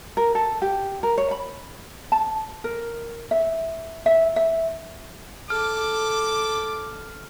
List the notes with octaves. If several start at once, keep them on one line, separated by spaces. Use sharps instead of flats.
A#4
A4
G4
A#4
C#5
B5
A5
A#4
E5
E5
E5
A4 D6 F6